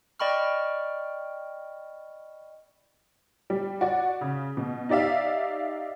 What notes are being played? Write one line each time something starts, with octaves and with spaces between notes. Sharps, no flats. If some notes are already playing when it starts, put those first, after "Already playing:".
D5 D#5 G5 B5 C#6 F6
G3
F#4 D5
C#3
B2
D#4 G4 D5 E5 F5